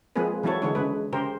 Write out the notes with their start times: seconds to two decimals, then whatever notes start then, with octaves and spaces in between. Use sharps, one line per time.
0.16 F3 G#3 A#3 C4 G#4 B4
0.43 E3 F#3 C4 E4 A4 C#5
0.62 D3 E3 G#3 D4 C#5
0.75 C#3 G#3 B4
1.13 C#3 G4 A#4 C5